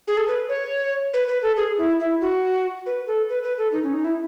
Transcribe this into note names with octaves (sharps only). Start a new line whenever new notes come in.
G#4
A4
B4
C#5
B4
B4
A4
G#4
E4
E4
F#4
B4
A4
B4
B4
A4
D#4
C#4
D#4
E4